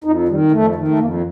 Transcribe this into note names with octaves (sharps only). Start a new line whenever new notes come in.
F2 D#4
D#3 G3
F2 A3
D#3
A3
F2 A#3